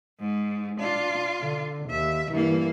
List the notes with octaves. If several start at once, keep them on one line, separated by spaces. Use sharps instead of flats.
G#2
D4 F4
D3
D#2 E5
G2 E3 A#3